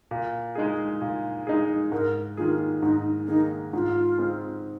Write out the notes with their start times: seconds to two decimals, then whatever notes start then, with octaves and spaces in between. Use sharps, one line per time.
0.11 A#2
0.55 G#3 D#4 G#4
1.01 A#2
1.47 G#3 D#4 G#4
1.92 G#2 A#4
2.37 D#3 A#3 F4 G#4
2.82 G#2 D#4
3.28 D#3 A#3 D#4 G#4
3.73 G#2 F4
4.18 G#3 C4